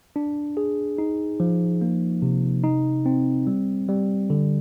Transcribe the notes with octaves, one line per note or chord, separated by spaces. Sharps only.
D4
G#4
D#4
F3
A#3
C3
D#4
C4
G3
G3
D3